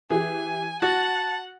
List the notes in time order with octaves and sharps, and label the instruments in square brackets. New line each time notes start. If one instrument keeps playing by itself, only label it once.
[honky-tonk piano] E3 G4 [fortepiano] G#4 [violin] G#5
[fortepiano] F#4 [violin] F#5 [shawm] A5 [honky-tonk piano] A6